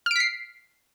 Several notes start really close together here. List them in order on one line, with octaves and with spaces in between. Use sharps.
F6 D7 B6 C7